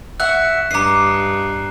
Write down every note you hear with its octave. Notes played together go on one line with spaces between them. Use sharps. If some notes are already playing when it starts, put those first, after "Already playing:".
F#4 E5 F#5 F#6
G2 D#5 A#5 D6 C7